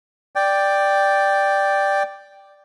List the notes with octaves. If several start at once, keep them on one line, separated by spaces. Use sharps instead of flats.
D5 G5